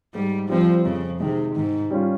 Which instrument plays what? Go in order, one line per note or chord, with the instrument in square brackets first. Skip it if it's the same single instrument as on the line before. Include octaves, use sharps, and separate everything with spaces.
[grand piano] G#2 [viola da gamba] G3
[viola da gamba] F3 [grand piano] G3 C4
[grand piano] F2 [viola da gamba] C#3
[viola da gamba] C3 [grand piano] D#3 G#3
[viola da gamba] G#2 [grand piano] D#3
[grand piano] G3 C#4 F4